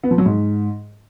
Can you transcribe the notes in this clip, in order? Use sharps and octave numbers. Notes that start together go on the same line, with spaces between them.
B3
F3
F#3
G#2